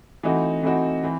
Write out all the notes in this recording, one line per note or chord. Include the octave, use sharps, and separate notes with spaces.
E3 A3 C4 D#4 F#4
E3 A3 C4 D#4 F#4
E3 C4